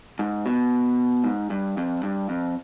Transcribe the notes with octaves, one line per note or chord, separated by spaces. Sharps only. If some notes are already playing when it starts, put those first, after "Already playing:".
G#2
B2
G#2
G2
F2
G2
F2